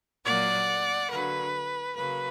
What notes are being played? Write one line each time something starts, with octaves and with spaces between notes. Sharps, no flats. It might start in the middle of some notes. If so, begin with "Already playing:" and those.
A#2 F#3 A#3 D5 F#5
D3 F#3 A#3 B4
C#3 F#3 A#3 B4